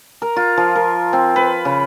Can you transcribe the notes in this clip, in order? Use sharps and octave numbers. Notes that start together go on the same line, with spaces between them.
A#4
F4
F3
A#4
C4
B4
C#3